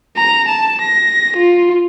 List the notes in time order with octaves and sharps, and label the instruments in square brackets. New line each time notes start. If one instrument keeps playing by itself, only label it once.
[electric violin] A#5
A5
A#6
F4